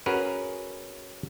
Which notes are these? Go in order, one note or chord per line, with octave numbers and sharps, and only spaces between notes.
C#4 F#4 G#4 A#4 B4